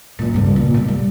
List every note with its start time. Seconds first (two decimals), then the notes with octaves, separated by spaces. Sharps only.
0.19 F#2 A#2
0.34 C#2 G2
0.56 A#2
0.74 B1
0.88 G3